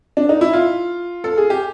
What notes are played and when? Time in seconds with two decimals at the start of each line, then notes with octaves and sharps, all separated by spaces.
0.17 D4
0.29 D#4
0.41 E4
0.53 F4
1.24 A4
1.38 G#4
1.50 G4